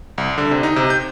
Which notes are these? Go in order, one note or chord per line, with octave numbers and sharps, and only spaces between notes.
C2
D3
C3
D#4
C3
G6